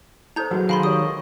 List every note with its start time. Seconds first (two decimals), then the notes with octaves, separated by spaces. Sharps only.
0.36 D#4 A4 C5 A#5 G6
0.51 F#3 G#3 B4 F#5
0.69 D#3 F5 G#5 B5 C6
0.83 G4 C#5 D#6